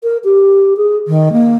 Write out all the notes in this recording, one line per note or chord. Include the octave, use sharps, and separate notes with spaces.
A#4
G4
G#4
D#3
A#3